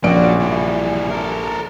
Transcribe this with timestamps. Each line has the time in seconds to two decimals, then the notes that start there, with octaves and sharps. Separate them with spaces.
0.04 A#1 C#4 F#4 D5 D7
0.40 E3 G3
1.10 A4 A#4